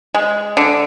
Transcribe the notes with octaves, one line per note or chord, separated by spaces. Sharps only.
G#3
D3